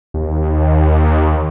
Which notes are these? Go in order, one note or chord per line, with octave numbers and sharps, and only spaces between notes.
D#2